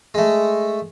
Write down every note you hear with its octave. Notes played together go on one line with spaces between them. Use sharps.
G#3 A3